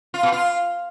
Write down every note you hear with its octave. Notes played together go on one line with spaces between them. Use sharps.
F4
B2
F4